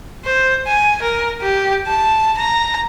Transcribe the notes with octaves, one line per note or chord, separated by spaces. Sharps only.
C5
G#5
A#4
G4
A5
A#5